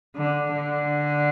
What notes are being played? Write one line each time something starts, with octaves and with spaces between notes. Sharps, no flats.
D3
D3